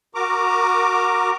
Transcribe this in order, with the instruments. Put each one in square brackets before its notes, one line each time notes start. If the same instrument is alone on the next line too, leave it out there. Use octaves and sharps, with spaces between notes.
[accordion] F#4 A#4 A#5 D6